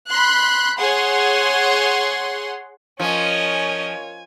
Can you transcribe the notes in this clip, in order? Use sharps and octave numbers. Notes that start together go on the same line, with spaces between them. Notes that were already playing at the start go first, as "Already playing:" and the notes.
B5 C6 F#6
G#4 C#5 F#5 C6
F3 C#4 A#4 C#5 D#5 G#5